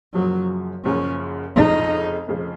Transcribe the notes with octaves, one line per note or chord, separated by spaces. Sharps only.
F#1 F#2 C#3 F3 F#3
F#1 F#2 C#3 F3 C#4
F1 F2 C#3 F3 D#4
F1 F2 C#3 F3